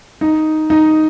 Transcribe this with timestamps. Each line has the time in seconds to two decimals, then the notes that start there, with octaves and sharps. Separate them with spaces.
0.21 D#4
0.70 D#4